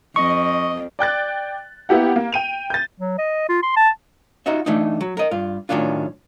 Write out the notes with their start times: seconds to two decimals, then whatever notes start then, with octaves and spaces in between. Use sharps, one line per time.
0.16 F2 D#5 C#6
0.99 D5 G5 F#6 A6
1.89 A#3 B3 E4 G4 F#5
2.16 A#3
2.32 G5 D#7 F7
2.70 G6 A6
3.00 F#3
3.18 D#5
3.49 F4
3.63 C6
3.77 A5
4.46 D#4 F4 F#4 D#5 E5
4.66 E3 A3 D4 D#4
5.01 F#3
5.17 A#4 D#5
5.31 G2 F4
5.69 A2 D#3 F#3 C#4 D4 F4